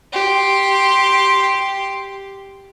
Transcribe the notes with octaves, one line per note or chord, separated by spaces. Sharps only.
G4 C6